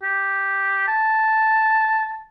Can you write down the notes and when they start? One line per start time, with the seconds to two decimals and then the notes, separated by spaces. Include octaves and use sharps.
0.03 G4
0.88 A5